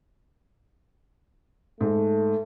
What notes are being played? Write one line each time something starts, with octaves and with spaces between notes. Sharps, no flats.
G#2 A3